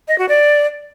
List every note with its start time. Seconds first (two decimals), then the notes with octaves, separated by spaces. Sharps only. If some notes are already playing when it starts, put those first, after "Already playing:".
0.08 D#5
0.18 F#4
0.29 D5